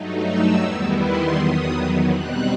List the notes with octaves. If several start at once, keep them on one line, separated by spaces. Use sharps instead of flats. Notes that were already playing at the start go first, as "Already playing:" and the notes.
Already playing: G2 F#3 A3 D#4
E6
E2 D#3 G3 B3 E4
C6
E2 D#3 F#3 B3 D#6
B2 G3 C4 D#4 F#6